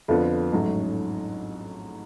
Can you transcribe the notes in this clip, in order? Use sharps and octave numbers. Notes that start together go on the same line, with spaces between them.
F2 D3 F3 B3 D4
A1 G#2 F#3 A3 C#4